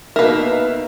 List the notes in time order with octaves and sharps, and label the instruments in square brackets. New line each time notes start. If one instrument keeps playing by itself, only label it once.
[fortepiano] B2 A#3 [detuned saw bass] D#4 [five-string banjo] A#4 B4 [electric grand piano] E5 F5